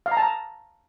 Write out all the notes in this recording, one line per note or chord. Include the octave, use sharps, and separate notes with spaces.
F5
A#5
A5
A#5